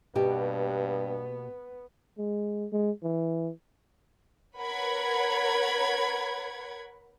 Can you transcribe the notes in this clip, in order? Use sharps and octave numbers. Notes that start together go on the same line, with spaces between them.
G2 B2 A#3 B3 G4
G#3
G#3
E3
A#4 B4 C#5 F#5 B5 G#6